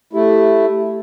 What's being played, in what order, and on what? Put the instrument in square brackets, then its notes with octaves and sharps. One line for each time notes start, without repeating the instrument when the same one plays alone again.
[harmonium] A3 E4 [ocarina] G4